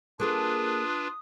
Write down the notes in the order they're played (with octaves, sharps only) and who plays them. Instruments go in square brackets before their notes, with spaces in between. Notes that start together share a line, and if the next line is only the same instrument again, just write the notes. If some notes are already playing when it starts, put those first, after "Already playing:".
[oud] A#3 G#4 A4 [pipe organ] D4 F4 B4 [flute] D#6